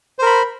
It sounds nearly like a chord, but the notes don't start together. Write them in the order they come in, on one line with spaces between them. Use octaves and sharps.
C5 A#4 B5